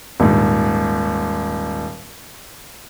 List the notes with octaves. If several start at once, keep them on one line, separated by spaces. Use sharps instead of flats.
D#1 G#2